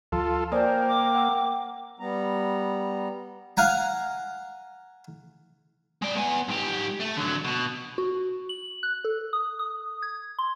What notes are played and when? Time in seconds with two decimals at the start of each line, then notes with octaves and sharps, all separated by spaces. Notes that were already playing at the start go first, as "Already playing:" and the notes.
0.12 D2 F3 F4 A4
0.52 A#3 C5 D5 G5 G#5 D#6
0.88 D6
1.15 F#5 E6
1.99 G3 B3 A#5
3.57 F5 F#5 G#5 A#5
6.02 G#3 D5
6.16 B3 G#5
6.48 G#2 G4
7.00 A3
7.17 D3 F#3
7.44 B2
7.98 F#4
8.49 F#7
8.83 F#6
9.05 A4
9.33 D#6
9.59 D#6
10.02 G#6
10.39 C6